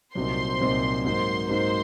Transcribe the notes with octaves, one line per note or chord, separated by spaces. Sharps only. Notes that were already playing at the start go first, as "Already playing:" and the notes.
C2 A#2 F#3 C4 D#4 C5 C6
C2 A#2 F#3 C4 D#4
G#2 F#3 A#3 D#4 C5 C6
G#2 F#3 A#3 D#4 C5 C6